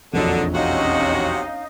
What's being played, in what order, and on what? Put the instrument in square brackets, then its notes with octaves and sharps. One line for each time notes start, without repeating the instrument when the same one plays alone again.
[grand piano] E1 A#1 F2 [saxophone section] D3 [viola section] F#3 [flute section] D#4 A5
[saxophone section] C3 F#3 F#4 [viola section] C#4 D#5 [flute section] D#4 F5